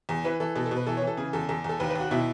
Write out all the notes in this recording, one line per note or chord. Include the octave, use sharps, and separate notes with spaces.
E2
E3 B4
E3 A4
B2 A4
A4
B2
B4
E3 A4
C#5
E3
A4
C#3 G#4
E2 A4
E2 A4
E2 A4
D#2 B4
B4
D#2
F#4
B2 E4